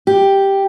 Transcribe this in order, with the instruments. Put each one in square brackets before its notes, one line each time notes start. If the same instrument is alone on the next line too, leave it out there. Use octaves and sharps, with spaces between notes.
[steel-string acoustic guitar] G4